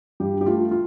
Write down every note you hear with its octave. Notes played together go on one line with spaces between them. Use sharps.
G2 G4
G4
A3 F4
F4